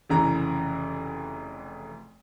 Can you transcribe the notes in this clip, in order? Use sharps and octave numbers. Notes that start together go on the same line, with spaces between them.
F1 C#3 E3 A#5